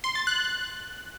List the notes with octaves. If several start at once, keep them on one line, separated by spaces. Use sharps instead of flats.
C6
A6
F#6